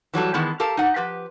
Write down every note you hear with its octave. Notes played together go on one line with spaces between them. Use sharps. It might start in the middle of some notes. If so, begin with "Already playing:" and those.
E3 F#3 G3 A4
D#3 E3 G#3 B3
G4 A4 A#4 F5 A5
D#4 F#5
F3 G4 B4